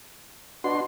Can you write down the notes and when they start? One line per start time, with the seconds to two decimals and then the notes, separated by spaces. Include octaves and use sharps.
0.64 B2 D4 F#4 C6